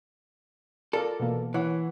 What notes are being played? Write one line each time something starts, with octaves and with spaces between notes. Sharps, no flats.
F4 A4 A#4 D5
B2 E3 A#3
B2
E3 C#5 F#5